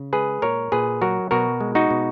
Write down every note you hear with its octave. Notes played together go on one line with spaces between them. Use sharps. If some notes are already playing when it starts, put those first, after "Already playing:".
Already playing: C#3
G#3 G#4 B4
A#2 A#4 C#5
A#2 G#4 B4
F#3 F#4 A#4
B2 F#4 A#4
G#3
D#4 F#4
B2